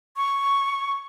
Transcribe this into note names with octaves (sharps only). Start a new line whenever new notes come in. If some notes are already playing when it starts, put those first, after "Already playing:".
C#6